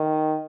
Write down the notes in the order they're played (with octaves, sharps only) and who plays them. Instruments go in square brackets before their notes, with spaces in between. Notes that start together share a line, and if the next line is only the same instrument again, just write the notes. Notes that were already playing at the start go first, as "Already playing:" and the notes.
Already playing: [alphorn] D#3